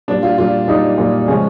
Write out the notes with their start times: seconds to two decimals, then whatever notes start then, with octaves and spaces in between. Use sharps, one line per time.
0.08 A#2 G3 D4
0.23 F4
0.38 A#2 G3 F4
0.68 A#2 G3 D#4
0.98 A#2 G3
1.28 C#3 F3 G#3 C#4